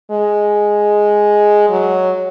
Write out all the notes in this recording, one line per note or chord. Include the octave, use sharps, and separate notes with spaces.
G#3
F#3